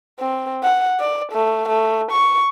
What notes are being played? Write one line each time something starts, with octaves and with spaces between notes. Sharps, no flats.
C4
F#5
D5
A3
A3
C#6